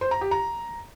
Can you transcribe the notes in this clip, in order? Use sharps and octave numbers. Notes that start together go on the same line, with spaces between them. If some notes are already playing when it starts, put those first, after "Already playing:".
C5
A#5
G4
A#5